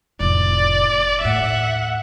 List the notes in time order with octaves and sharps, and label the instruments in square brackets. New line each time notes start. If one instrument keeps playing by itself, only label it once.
[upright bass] F1 A2 [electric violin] D5
[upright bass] D#2 A2 [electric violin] E5 F#5